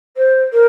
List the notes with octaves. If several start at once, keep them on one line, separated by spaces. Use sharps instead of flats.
C5
A#4